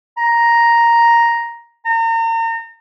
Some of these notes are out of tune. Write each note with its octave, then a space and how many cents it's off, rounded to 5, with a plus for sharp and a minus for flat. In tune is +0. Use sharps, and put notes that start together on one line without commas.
A#5 +5
A#5 -35